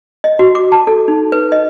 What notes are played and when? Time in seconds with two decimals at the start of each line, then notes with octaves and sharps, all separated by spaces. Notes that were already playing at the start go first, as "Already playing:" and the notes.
0.24 D#5
0.39 F#4
0.55 D6
0.72 A5
0.87 A4
1.08 D#4
1.32 B4
1.52 D#5